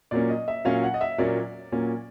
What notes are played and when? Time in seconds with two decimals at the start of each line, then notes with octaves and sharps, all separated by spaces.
0.11 A#2 F#3 A#3 C#4 D5
0.29 D#5
0.48 E5
0.65 A#2 F#3 A#3 C#4 F5
0.83 F#5
0.94 D#5
1.01 E5
1.18 A#2 F#3 A#3 C#4 D5
1.72 A#2 F#3 A#3 C#4